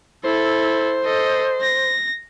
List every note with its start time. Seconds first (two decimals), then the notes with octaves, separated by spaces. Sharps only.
0.25 E4 A4 C5
1.04 A4 D#5
1.61 A#6